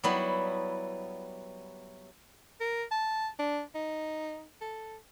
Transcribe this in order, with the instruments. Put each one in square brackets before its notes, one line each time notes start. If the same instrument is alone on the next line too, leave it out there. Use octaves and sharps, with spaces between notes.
[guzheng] F#3 G3 B3 E4
[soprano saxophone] A#4
A5
D4
D#4
A4